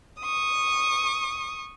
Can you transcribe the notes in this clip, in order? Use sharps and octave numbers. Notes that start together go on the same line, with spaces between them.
C#6 D#6